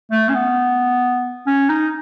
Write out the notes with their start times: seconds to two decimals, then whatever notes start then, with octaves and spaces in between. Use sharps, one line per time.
0.12 A3
0.29 C#4
0.35 B3
1.47 C#4
1.69 D#4